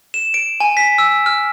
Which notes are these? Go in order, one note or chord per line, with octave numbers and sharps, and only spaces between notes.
E7
D7
G#5
B6
E6
F6